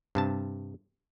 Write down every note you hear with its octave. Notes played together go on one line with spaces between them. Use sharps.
G2 C3 A5